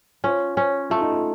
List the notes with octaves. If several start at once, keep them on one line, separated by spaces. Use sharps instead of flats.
C#4 F4
C#4
A3 F4
D#4
F4